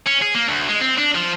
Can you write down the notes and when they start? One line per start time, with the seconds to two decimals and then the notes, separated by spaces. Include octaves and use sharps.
0.06 C#4
0.21 G#4
0.34 A#3
0.48 D2
0.68 G#3
0.81 C4
0.98 D4
1.15 F3